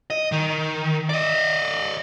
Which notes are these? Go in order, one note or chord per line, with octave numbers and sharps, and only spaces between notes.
D#5
D#3
D5 D#5